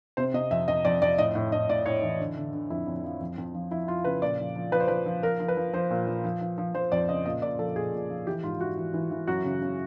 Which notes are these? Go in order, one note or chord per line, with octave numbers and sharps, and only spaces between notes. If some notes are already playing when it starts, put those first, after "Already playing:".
C3 C5
C3 D#5
F2 E5
F2 D#5
F2 D5
F2 D5
A2 D#5
A2
A2 D#5
A2 D5
A2 C#5
E3
D3
D3
D3
F2 E4
F2
F3
F2
F2
F3
F3 E4
F3 F4
C#3 B4
A#2 D5
F3
F3
F3 B4
C5
F3 B4
F3
F3 A#4
F3
B4
F3
F3 C5
A#2
F3
F3
F3
F3
F3 C5
F2 D5
C#3 D#5
A#2 D#5
A#2 D5
F3 A4
A#2 G#4
A#2
F3
E3 G4
G#2 F4
E3 F#4
E3
E3
E3
F#2 F#4
C#3
C#3